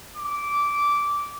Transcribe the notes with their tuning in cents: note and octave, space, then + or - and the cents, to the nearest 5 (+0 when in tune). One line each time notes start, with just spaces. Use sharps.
D6 -15